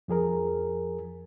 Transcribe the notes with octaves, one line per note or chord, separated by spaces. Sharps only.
F2 F3 G#4 A#4